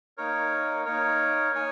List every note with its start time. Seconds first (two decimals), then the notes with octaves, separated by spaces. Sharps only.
0.17 A#3 D#4 A#4 C#5
0.85 A#3 D#4 A#4 C#5
1.52 D#4 C#5 G#5